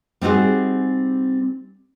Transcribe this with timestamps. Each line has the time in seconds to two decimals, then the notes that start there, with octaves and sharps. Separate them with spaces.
0.21 G3 C4 D#4 F#4 G#4